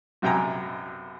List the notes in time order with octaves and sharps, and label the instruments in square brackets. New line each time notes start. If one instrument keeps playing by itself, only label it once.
[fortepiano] B1 F#2 C3 G5 G#5 A#5